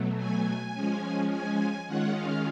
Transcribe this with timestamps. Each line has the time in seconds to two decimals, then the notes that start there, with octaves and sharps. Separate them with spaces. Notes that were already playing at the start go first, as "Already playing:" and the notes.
Already playing: B2 F#3 A3
0.18 G#5
0.74 F3 G#3 C#4
1.31 G#5
1.87 D#3 G#3 C#4 F4 F#5
2.15 F5